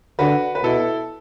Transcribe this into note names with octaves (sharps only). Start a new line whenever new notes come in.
D3 F#4 B4
B4
B2 E4 A4